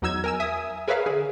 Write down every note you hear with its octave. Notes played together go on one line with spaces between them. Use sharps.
E2 F#3 D#4 E6 G#6
A#4 G#5 E6
E5 G#5 D#6
G#4 A#4 B4 C#5 E5 F5
D3 G#4